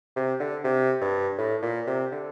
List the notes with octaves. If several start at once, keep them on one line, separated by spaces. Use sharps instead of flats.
C3
D3
C3
G2
A2
A#2
C3
D3